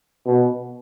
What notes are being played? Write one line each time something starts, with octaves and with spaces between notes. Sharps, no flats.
B2